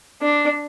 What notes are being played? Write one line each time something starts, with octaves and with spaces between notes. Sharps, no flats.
D4